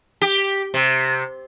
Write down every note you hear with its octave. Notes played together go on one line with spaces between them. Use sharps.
G4
C3